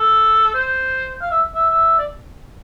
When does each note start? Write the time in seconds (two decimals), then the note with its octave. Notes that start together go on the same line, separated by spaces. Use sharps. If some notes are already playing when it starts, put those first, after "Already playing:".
Already playing: A4
0.54 C5
1.21 F5
1.31 E5
1.55 E5
1.70 E5
1.98 D5